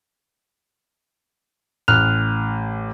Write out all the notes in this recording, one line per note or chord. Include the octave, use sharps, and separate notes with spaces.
A1 F6 F#6 F7